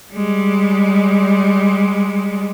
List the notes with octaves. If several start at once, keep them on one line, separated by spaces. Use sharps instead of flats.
G3 G#3